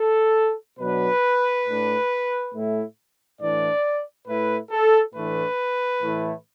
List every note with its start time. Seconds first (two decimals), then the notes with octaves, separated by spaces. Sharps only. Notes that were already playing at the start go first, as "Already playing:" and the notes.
Already playing: A4
0.79 B2 F#3 D4 B4
1.66 A2 A3 D4
2.54 A2 A3 E4
3.41 A2 E3 D4 D5
4.28 A2 A3 E4 B4
4.71 A4
5.15 A2 E3 A3 D4 B4
6.02 A2 E3 A3 E4